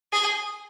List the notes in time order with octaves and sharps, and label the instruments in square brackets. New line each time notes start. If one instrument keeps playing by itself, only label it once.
[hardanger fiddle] G#4